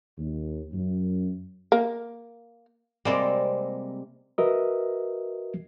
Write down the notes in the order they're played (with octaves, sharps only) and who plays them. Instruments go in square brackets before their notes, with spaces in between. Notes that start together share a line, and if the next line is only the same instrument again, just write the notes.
[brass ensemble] D#2
F#2
[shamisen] A#3
[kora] C3 G#3 A#3 [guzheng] G3 C4 D5
[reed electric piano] F#4 A#4 B4 D#5 E5